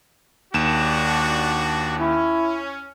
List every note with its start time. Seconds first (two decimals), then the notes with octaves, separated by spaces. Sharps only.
0.54 D#2 D4 F#4 E7
1.98 C#4 E4